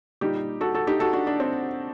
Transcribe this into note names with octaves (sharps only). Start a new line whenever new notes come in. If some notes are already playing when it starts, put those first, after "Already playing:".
A#2 G3 D#4 G4
F#4 A4
F#4 A4
D#4 G4
F#4 A4
D4 F#4
D4
C4